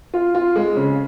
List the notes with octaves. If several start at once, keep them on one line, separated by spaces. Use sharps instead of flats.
F4
F4
G#3
C#3